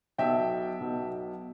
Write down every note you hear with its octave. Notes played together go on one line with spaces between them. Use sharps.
B1 B2 E5 G5
B1 B2